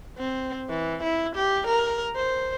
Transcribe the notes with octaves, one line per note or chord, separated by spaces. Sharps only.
C4
E3
E4
G4
A#4
C5